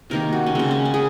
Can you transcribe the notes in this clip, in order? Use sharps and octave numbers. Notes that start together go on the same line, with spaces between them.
C3 D#3 A#3 A#4
F#4
C#4
C#3 G#3 C4
C#4
C#4
G#4